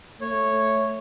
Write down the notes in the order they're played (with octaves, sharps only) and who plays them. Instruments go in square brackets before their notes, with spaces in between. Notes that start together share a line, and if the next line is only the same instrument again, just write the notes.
[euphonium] A3 [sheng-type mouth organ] C#5